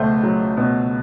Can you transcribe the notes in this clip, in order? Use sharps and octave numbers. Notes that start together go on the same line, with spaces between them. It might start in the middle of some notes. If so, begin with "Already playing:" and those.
Already playing: C#2 B2 A3 C5
F#3
B2